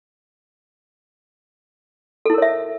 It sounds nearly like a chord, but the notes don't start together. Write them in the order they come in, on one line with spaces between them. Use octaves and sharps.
A4 E4 A#4 C#5 E5